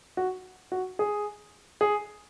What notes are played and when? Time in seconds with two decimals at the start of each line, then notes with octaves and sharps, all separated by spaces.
0.17 F#4
0.72 F#4
0.99 G#4
1.81 G#4